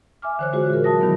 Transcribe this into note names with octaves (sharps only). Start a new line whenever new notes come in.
E5 G#5 D6 F6
D3 E3 C5 C#5 F#6
D3 G#3 F4 F#4 G#4 C5
A#2 A#4
F#3 F#4 E5 A5 D#6 A#6
B2 D#3 F#3 B3 E4